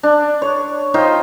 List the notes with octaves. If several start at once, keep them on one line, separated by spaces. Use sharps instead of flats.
D4
C#5
D#4 F4 C5 G5